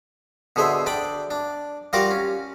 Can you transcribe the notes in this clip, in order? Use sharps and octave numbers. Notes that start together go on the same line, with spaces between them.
B2 D3 G#4 C5 E5
D4 D5 G5 B5
D4
G3 F4 F#4 A#4 A#5 D6
C#4